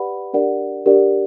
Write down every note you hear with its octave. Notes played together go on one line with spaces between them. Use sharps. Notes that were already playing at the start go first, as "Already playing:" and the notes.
Already playing: G4 B4 D5 F#5 B5
D4 G4 A#4 D5 F#5
D4 G4 A#4 D5 F#5